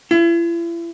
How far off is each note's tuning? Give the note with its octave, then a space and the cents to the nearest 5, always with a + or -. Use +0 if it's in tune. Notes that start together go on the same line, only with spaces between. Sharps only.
E4 +40